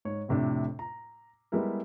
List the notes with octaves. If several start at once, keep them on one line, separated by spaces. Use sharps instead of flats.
G#2 C#5
F2 A2 C3 A3 D4
A#5
G3 G#3 B3 E4 A#4